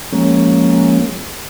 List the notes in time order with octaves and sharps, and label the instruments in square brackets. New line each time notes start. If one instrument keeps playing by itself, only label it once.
[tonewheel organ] F3 G#3 A#3 C#4